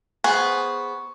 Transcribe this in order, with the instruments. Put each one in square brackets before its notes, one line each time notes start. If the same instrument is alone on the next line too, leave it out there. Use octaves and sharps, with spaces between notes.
[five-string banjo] B3 G#4 C5 [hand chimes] C#6